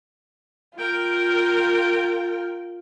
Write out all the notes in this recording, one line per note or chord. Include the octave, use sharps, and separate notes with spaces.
F4 A#4 G5